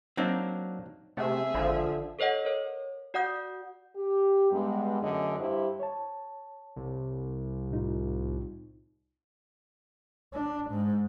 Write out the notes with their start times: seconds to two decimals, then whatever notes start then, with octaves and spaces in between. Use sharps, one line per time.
0.17 F#3 A#3 C4 D4 D#4
1.17 C3 A3 G#4 E5
1.54 G#1 D3 F3
2.19 A4 B4 C#5 D#5 F#5
2.45 A#4 C#5
3.14 F#4 D5 F#5 D#6 G6
3.96 G4
4.52 G2 G#3 B3
5.02 F#2 D3 A3 C#4 G#4 D#5
5.38 G2 E4 G4 C5
5.80 C#5 A5
6.76 C2
7.71 A2 D#4 F4
10.34 D4
10.71 G#2